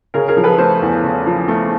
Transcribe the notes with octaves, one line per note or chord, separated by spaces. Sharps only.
C#3 G#4 A#4
G#4 A#4
F3
A4 B4
A3 A#4 C5
E2
C#3
F3
A3